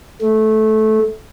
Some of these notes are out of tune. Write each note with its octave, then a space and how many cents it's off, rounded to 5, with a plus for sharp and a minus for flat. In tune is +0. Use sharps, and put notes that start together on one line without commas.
A3 -15